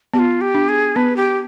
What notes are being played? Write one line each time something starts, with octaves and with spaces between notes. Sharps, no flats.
B3 G4
F4
G4
D4
G#4
B3 B4
G4